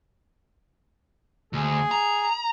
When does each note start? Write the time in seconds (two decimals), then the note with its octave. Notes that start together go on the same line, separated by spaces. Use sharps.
1.53 D2 G#4
1.91 A#5